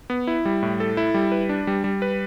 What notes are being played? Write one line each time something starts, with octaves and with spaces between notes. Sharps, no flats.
B3
E4
G3
A2
A4
E4
G3
B4
D4
G3
G3
B4